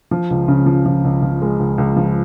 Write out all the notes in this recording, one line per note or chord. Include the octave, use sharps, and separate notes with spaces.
F3
C#2
C#3
F3
F3
C#2
F3
G#3
C#2
C#2
F3